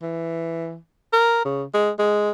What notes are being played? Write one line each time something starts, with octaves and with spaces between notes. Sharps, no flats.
E3
A#4
C#3
G#3
G#3